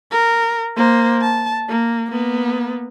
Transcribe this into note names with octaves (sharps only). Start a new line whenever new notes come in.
A#4
A#3 C5
A5
A#3
A#3 B3